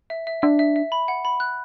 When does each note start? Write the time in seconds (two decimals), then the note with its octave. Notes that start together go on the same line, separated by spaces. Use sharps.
0.10 E5
0.27 E5
0.42 D4 E5
0.59 E5
0.76 E5
0.92 B5
1.08 F#5
1.25 B5
1.40 F#6